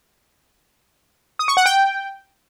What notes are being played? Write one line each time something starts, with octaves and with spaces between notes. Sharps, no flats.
D#6
C#6
F#5
G5